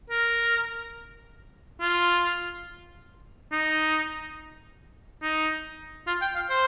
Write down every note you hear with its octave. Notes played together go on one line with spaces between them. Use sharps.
A#4
F4
D#4
D#4
F4
G5
F5
C5